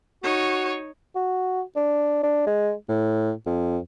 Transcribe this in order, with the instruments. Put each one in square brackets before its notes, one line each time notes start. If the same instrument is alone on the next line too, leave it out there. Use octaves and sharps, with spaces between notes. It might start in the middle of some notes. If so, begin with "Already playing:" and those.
[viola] D#4 C#5 [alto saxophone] F#4
[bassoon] F#4
D4
D4
G#3
A2
F2